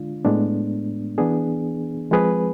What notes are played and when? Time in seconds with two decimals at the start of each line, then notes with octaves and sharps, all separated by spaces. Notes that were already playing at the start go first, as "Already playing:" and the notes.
Already playing: D3 G#3 D4 F4
0.25 A2 G#3 B3 D4
1.18 E3 B3 D4 G#4
2.11 F3 G#3 C4 G#4 B4